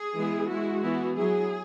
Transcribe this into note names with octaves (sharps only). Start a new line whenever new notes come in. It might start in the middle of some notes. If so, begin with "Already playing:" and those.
Already playing: G#4
E3 G#3 B3 E4
G#3 E4 F#4
E3 B3 E4
F#3 E4 G#4